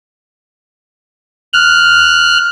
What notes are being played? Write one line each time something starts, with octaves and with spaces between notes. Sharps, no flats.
F6 F#6